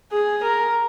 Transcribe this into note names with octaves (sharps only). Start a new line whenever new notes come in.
G#4
A#4